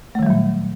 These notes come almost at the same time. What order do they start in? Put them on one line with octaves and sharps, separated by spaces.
A3 D#3 G3 F#3 A#2